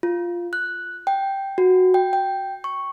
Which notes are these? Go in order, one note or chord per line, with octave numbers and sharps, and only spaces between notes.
F4
F#6
G5
F#4
G5
G5
C#6